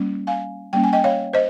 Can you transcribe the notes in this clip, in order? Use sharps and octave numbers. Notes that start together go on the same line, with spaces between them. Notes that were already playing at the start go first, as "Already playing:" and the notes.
Already playing: G3 A#3 C#4
F5 G#5
G3 A#3 C#4 G5
G#5
D#5 G5
C#5 F5
C5 D#5